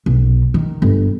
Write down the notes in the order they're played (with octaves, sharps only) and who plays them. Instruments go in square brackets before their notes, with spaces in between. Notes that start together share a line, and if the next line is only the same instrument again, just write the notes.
[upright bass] B1
D#3
G1